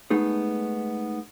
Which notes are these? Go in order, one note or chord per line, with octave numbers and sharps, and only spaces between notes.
G#3 A3 B3 D#4 G#4